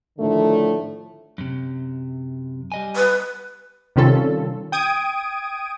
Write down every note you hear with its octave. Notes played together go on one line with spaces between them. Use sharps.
A2 D3 D#3 F3 A3
F#2 C3
G3 D#5 G#5
B4
C3 D#3 G3 C#4 F4 A4
G5 D#6 G#6 D7 D#7